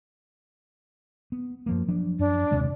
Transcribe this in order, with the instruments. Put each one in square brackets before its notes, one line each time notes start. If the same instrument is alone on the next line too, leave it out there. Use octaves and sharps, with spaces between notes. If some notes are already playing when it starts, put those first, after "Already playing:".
[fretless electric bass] B3
F#2 F3 A#3
F3 F#3 D4
[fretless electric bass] F#2 [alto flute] D4
[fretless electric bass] D#2 C3 G#3